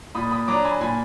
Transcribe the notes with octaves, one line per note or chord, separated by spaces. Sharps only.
A#2 B5 D#6
B5 D#6
F#3 D4 A#5 D6
G#5 B5
A#2 G#5 B5